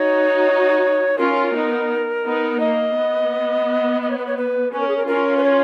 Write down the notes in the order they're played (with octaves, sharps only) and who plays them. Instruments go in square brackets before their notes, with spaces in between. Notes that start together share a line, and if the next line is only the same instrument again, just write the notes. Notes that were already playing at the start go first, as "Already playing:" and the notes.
Already playing: [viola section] D#4 F#4 [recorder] C#5
[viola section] C#4 F4 [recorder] A#4
[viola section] B3 D#4
B3 D#4
[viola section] A#3 [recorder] D#5
[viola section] B3
[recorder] D#5
C#5
B4
C#5
B4
[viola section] C#4 [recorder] B4
[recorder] A#4
G#4
A#4
[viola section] C#4 F4 [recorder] A#4
[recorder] B4
C#5